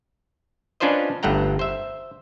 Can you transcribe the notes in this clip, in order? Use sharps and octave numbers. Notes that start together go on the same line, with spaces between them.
C#4 D4 F4 B4 C5 D#5
G1 G2 A3 F#5 G5 A#5
C5 E5